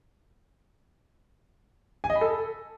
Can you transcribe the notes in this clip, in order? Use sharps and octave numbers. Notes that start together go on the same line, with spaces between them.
G#5
D#5
B5
A4